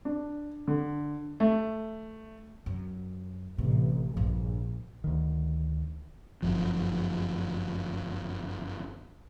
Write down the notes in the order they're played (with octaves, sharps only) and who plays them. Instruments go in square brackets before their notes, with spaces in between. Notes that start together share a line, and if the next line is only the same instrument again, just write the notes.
[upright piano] D4
D3
A3
[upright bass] F#2
[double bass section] A1 [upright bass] C3
[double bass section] A#1 [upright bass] G2
[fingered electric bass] D2 D#3
G1 F#2 F3